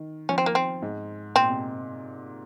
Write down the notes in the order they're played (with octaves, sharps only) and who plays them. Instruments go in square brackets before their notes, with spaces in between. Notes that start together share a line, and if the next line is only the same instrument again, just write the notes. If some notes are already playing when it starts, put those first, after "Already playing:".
Already playing: [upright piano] D#3
[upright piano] F3 [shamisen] C#4
[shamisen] C4
A#3
C4
[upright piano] G#2
[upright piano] A#2 [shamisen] C4
[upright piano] C3